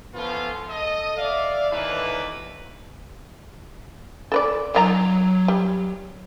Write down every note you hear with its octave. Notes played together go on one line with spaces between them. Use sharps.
F3 A3 B3 C#4 F4
A4 D#5
D5 E5 F5
D#2 A2 E3 A#3 D4 B4
A4 B4 D5
D#3 F#3 F4 A#5
G3